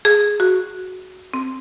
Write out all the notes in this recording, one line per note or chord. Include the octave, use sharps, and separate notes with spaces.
G#4
F#4
C4